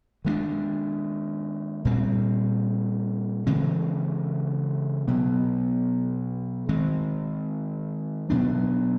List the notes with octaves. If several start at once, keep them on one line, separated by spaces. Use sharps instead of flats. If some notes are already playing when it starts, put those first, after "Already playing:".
D#3 G#3 B3 D4
A#2 G3 C4
C#3 E3 G#3 C4
B2 F#3 B3
D#3 G#3 C4
B2 F#3 B3 D4